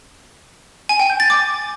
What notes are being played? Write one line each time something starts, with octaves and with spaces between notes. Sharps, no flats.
G#5
G5
G6
A6
D6